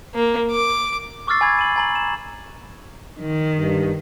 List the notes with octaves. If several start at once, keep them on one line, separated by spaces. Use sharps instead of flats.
A#3
D6
C#6 D6 E6 F6 A6 C7
G#5 B5 G#6
D#7 F#7
G#5 A#5 F#7
E7
D#3
G2